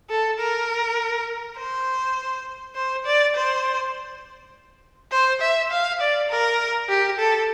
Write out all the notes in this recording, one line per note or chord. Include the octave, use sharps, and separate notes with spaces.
A4
A#4
C5
C5
D5
C5
C5
E5
F5
D5
A#4
G4
A4